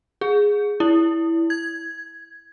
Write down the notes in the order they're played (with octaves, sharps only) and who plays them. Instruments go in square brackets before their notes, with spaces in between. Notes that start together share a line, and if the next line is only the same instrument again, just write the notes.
[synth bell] G#4
E4
G#6